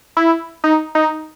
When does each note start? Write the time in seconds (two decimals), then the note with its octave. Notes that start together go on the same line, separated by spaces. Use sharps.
0.17 E4
0.64 D#4
0.95 D#4